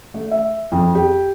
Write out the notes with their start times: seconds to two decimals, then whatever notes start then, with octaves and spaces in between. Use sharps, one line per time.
0.14 A3
0.31 E5
0.72 F2
0.95 G4